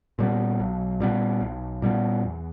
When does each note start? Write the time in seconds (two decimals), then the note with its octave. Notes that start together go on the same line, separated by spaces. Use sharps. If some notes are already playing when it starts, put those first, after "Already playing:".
0.19 A#2 G3 B3
0.59 B1
1.00 A#2 G3 B3
1.41 B1
1.82 A#2 G3 B3
2.23 E2